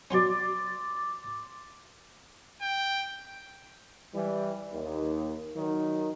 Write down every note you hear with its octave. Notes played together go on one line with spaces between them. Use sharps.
B2 F#3 C#4 D5 C6
G5
E3 G3
D#2
D#3 F#3